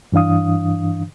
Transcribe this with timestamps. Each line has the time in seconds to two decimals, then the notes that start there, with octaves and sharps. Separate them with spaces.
0.12 G2 E3 D4 F5 D#6